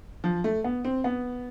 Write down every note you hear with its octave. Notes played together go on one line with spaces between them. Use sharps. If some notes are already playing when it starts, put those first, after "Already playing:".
F3
A3
B3
C4
B3